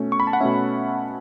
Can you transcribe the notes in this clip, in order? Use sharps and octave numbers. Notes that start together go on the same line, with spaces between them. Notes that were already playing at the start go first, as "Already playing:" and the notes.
Already playing: B2 A3 C#4
C#6
B5
A5
F#5
B2 A3 C#4 E5